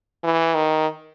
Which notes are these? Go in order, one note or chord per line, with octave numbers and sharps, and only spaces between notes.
E3
D#3